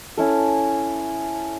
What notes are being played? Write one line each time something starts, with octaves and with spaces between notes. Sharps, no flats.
C#4 E4 A4